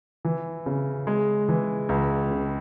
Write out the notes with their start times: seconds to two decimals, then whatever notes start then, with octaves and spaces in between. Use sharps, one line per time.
0.25 E3
0.66 C#3
1.07 G#3
1.48 E3
1.89 C#2
2.31 C#3